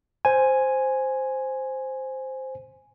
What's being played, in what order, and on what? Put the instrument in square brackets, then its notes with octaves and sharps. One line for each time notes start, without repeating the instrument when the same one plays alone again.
[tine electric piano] C5 G#5